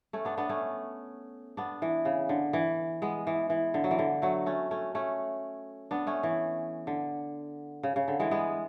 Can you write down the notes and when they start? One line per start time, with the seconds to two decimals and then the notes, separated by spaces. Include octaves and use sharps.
0.13 A3 C#4
0.25 B3 D4
0.37 B3 D4
0.49 A3 C#4
1.57 B3 D4
1.82 E3
2.05 C#3
2.29 D3
2.53 E3
3.02 G#3 B3
3.27 E3
3.50 E3
3.74 D3
3.84 F#3
3.91 E3
3.99 D3
4.22 F#3 A3
4.46 A3 C#4
4.71 A3 C#4
4.95 A3 C#4
5.91 B3 D4
6.07 A3 C#4
6.23 E3
6.87 D3
7.83 C#3
7.96 C#3
8.08 D3
8.20 E3 G#3
8.31 G#3 B3